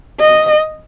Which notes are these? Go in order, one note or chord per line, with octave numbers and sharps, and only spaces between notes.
D#5